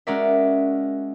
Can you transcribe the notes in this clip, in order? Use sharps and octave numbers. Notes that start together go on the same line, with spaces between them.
G#3 C#4 F#4 A#4 D5 E5